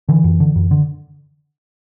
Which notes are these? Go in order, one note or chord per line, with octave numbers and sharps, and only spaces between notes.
D3 E3
F#2
D3
F#2
D3